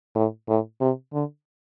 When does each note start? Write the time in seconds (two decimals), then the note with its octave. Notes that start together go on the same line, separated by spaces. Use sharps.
0.15 A2
0.48 A2
0.81 C3
1.13 D3